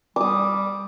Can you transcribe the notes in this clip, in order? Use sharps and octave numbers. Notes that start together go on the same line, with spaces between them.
G3 D6 D#6